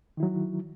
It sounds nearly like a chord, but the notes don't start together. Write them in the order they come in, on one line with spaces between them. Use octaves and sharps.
D#3 E4 F#3